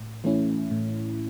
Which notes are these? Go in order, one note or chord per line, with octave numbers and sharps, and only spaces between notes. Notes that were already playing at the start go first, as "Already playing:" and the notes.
Already playing: A2
E3 A3 C#4 E4
A2